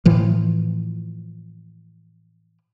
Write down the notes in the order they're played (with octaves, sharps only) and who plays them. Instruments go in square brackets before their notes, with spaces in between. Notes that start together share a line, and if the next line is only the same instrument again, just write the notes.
[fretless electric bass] A2 E3 F3